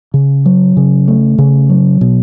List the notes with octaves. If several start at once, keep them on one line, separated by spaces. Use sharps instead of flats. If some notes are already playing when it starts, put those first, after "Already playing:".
C#3
F#3
C#3
A3
C#3
F#3
B2